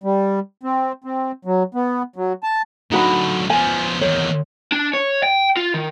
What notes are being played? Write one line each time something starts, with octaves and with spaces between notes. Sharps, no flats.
G3
C4
C4
F#3
B3
F#3
A5
D3 F#3 D#4 F#4 B5
F3 B3 G#5
E2 D#3 C#5
D4
C#5
G5
F4
D#3